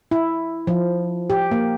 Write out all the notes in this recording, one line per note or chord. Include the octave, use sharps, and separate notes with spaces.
E4
F3
G4
A#3